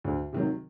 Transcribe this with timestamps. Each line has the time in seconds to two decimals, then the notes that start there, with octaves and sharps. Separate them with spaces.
0.04 D2
0.33 C3 D#3 F#3